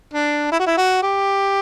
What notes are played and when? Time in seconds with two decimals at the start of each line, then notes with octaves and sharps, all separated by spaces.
0.14 D4
0.52 E4
0.60 F#4
0.67 E4
0.78 F#4
1.03 G4